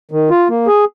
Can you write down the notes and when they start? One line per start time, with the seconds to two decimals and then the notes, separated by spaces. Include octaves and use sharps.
0.11 D#3
0.30 F4
0.49 A#3
0.67 G#4